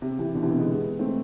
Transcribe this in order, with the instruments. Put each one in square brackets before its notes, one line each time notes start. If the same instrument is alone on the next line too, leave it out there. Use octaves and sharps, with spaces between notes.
[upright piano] C3
C3 E3
B2 D3
C3 E3
B2 D3
G#3 B3
A3 C4